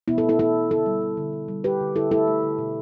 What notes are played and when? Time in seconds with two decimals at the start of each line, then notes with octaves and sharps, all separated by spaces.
0.08 B2 B3 E4
0.18 E4 A4
0.24 A3
0.29 E4 A4
0.39 A3 E4 A4
0.55 B2
0.71 D3 E4 A4
0.86 G3
1.02 G3
1.17 D3
1.33 D3
1.48 G3
1.64 G3 G4 B4
1.80 D3
1.95 D3 E4 A4
2.11 A3 E4 A4
2.27 A3
2.43 D3
2.58 B2